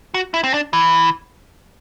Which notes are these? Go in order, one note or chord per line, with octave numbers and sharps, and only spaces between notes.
F#4
E4
C4
D4
E3